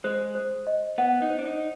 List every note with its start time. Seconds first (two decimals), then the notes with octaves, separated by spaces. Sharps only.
0.04 G#3 C5
0.35 C5
0.67 D#5
0.98 B3 F#5
1.22 D#4
1.30 C5
1.39 D4
1.46 D#4